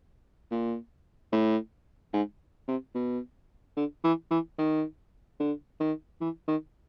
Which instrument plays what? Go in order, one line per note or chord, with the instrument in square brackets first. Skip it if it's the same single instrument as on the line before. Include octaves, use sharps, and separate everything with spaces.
[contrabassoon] A#2
A2
G#2
C3
B2
D3
E3
E3
D#3
D3
D#3
E3
D#3